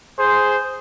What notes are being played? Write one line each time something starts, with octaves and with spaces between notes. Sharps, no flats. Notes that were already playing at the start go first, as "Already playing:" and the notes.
G#4 C5